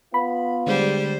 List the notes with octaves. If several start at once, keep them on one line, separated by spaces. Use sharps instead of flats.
B3 F4 B5
D3 G3 G#3 C5